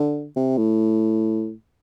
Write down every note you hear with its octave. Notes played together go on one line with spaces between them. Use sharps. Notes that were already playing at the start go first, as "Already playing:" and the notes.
Already playing: D3
C3
A2